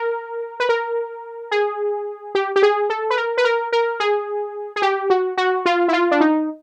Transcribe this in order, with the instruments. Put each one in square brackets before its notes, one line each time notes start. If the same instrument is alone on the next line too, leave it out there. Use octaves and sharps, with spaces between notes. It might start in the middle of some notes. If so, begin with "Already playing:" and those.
Already playing: [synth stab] A#4
B4
A#4
G#4
G4
G4
G#4
A4
B4
A#4
B4
A#4
A#4
G#4
G#4
G4
F#4
F#4
F4
E4
F4
D4
D#4